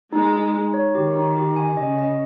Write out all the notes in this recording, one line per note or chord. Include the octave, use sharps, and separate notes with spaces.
G#3 D#4
D#4
D#4
C#5
D#3 G4
D#4
G4
G#5
C#3 D#5
D#5